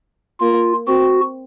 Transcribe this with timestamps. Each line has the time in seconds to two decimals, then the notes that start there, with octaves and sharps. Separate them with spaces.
0.40 A#3 F4
0.87 C4 F#4